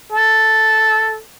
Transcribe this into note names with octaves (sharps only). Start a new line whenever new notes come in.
A4